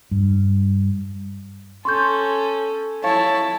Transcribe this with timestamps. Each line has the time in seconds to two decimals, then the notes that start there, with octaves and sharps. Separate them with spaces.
0.11 G2
1.85 C#4 A4 C6 C#6 G6
3.04 E4 C#5 F5 A5